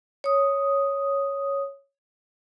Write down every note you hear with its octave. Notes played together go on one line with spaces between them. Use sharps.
C#5 D#6